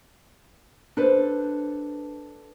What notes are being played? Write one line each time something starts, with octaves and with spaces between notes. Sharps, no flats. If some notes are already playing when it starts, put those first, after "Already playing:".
D4 A4 B4 C5